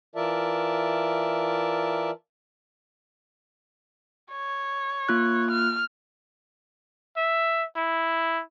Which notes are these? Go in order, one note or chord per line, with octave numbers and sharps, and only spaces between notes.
E3 F4 A#4 D5 E5 A5
C#5
A#3 F4 F#6
F6
E5
E4